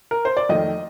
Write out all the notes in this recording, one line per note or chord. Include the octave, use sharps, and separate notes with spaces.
A#4
C5
D5
F2 D#3 A3 D#5